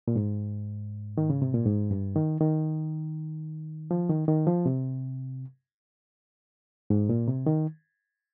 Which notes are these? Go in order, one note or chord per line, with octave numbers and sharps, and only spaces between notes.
A#2
G#2
D#3
C#3
C3
A#2
G#2
G2
D#3
D#3
F3
D#3
D#3
F3
C3
G#2
A#2
C3
D#3